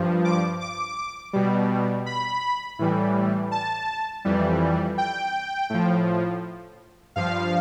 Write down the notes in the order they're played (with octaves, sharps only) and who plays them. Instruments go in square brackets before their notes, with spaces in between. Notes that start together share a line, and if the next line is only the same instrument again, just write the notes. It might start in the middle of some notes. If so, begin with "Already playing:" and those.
Already playing: [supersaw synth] G2 F3
D6
D6
B2 G3
B5
A2 E3 G3
A5
F2 E3 G3
G5
A2 F3
G2 F3 F5